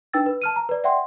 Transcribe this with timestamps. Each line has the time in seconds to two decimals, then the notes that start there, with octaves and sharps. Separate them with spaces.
0.13 D4 D#4 B4 G5 E6 A6
0.26 B4
0.42 A5 F6 D#7
0.56 A#5
0.69 B4 D5
0.84 D5 E5 F#5 G5 C6